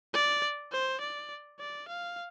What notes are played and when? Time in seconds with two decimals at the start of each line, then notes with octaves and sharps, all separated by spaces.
0.14 D5
0.72 C5
1.01 D5
1.60 D5
1.88 F5